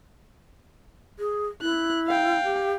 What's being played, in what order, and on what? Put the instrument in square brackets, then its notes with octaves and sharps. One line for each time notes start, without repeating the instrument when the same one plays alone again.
[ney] G#4
[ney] E4 [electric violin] F#6
[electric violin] F5 G5
[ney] G4